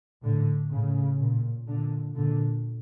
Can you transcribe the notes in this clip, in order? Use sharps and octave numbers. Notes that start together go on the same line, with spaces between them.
A2 D3
A2 C#3
A#2
A#2 D3
A#2 D3